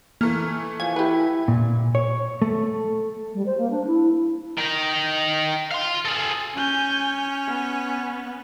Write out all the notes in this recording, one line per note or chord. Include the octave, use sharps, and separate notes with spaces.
E3 A3 A#3
F3 G#5
E4 G4 B4
A#2
C#5
A3
G3
C5
A#3
D4
E4
D#3 D#4
F5 C6
G#4 A4
C#4 G#5 G6
B3